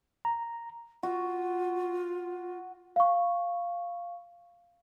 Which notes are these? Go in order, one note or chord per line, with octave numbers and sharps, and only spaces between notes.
A#5
F4 F#4
F5 C#6